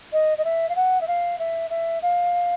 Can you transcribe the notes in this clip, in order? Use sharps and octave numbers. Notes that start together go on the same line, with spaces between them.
D#5
D#5
E5
F5
F#5
E5
F5
E5
E5
F5